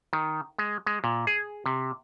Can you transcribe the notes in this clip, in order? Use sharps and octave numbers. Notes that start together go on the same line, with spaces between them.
D#3
G#3
G#3
A#2
G#4
C3